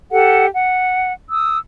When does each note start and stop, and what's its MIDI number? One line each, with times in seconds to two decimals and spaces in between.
0.11 0.46 67
0.11 0.46 69
0.11 0.46 78
0.54 1.14 78
1.30 1.58 87
1.30 1.58 88